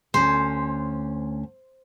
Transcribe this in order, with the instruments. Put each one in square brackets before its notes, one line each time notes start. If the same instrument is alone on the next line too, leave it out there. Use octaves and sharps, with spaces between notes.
[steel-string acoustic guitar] D2 C#4 [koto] C5